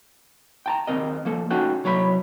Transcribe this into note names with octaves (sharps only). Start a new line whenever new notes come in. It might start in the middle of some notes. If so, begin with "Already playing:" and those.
G5 A5 A#5
D#2 C4 A#4 D#5
F3 A#3 A4
C#4 D#4 F#4 A4 F#5 G5
C2 F#3 C#5 E5 B5